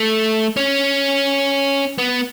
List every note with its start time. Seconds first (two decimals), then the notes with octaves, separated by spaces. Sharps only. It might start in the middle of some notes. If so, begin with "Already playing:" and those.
Already playing: A3
0.57 C#4
1.98 B3